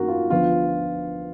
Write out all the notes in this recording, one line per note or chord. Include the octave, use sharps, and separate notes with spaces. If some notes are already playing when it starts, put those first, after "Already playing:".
Already playing: F#2 D#3 A#3 F#4 A#4
F4
D2 D3 F3 B3 F4